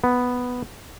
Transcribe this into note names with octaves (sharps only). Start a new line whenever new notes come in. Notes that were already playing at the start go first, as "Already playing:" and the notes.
B3